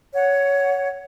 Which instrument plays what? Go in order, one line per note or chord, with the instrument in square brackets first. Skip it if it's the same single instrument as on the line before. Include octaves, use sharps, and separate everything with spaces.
[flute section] C#5 F#5